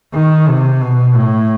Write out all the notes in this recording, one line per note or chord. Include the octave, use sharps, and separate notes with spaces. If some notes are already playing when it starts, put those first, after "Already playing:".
D#3
C3
B2
A2